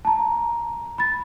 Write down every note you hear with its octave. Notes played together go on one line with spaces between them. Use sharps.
A5 A#5
B5 A6